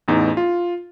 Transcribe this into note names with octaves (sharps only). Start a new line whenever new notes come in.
A1 E2 D#4
F4